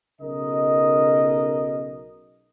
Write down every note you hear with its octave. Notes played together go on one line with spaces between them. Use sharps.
B1 C#3 D#4 A#4 D#5